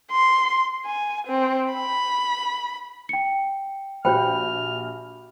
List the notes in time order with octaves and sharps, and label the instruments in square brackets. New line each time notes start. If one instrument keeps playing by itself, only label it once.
[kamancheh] C6
G#5
C4
B5
[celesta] G5 C#7
[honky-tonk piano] A#1 G4 G6 [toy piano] F#4 C5 G5 [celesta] B5 [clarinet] F6